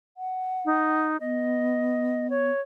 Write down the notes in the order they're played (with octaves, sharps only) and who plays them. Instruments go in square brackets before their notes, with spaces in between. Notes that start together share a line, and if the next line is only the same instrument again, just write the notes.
[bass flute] F#5
[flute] D#4
[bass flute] B3 [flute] D#5
[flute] C#5